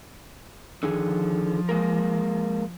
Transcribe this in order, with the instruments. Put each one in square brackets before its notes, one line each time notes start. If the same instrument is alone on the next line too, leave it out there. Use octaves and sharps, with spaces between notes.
[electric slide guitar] D3 D#3 G#4 [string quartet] F3
[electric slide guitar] G#3 A#3 A#4